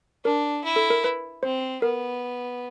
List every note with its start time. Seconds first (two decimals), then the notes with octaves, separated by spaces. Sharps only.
0.24 D4 A#4
0.64 E4
0.76 A4
0.90 A#4
1.04 B4
1.43 C4 C5
1.82 B3 A#4